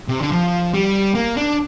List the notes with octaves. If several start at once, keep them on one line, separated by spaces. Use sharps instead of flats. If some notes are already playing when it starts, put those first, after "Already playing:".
C3
D3
F3
G3
A#3
D4